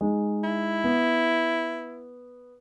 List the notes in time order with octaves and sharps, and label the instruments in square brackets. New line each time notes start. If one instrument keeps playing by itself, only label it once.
[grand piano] G#3 D#4
[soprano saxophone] E4
[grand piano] B3